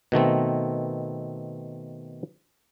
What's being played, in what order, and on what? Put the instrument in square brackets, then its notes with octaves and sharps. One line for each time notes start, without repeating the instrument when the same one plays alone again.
[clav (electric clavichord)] B2 D#3 A3 C4